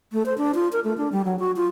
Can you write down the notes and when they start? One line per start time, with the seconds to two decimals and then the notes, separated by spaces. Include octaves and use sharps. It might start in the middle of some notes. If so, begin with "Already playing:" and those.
0.13 A3
0.26 C5
0.38 D4
0.55 F4
0.72 A#4
0.84 A3
0.97 D4
1.12 G3
1.25 F#3
1.39 F#4
1.56 F4